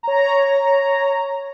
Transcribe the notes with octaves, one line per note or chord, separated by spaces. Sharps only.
C#5 A#5